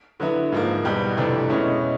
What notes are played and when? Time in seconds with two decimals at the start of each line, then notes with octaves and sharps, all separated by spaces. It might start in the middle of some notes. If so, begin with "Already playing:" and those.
0.20 D3 F#3 B3 E4
0.52 G#2 F3 A#3
0.85 E2 B2 G3
1.17 F2 C3 E3 A3 D4
1.49 B2 G#3 C#4 E4